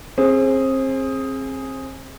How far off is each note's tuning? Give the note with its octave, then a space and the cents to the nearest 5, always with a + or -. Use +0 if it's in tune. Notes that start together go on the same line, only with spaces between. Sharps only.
C4 +30 G#4 +0